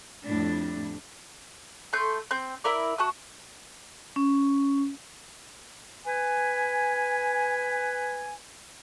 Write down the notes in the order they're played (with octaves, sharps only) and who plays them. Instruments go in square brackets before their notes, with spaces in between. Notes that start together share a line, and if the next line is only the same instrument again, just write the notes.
[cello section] F2 A2 G3 D4
[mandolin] A3 C6 G6
C4 G6
E4 A#4 D5
F#4 A5 D#6
[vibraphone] C#4
[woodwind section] B4 G#5